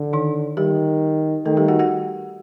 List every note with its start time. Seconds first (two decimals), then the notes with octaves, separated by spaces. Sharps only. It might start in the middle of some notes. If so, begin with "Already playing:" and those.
Already playing: D3
0.13 D#3 D#4
0.57 D#3 G3 G4
1.46 D#3 A3 A4
1.57 G3 G4
1.68 F#4 F#5
1.79 F#4 F#5